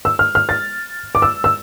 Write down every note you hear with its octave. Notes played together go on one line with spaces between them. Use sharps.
E6
F6
F6
A6
D6
E6
E6